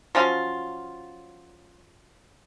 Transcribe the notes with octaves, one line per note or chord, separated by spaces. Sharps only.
F3 F#3 C#4 F4